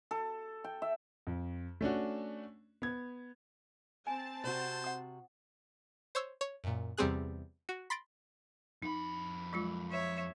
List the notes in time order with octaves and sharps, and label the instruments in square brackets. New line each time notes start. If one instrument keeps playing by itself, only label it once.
[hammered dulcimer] A4
G5
E5
[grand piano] F2
A3 C#4 D4 F#4
B3 G#6
[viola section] C4 A5 [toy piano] G#5
[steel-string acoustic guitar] C3 F#4 [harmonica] C5
[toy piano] F#5 D#6
[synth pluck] C5 C#5 E6
C#5
F#2 A#2
E2 C3 G3 C4 G#4 F#6
F#4
B5 C6 A6 A#6 D7
[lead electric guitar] F2 B5 [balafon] D#4
[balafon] F#3 G#3 F4
[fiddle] C#5 E5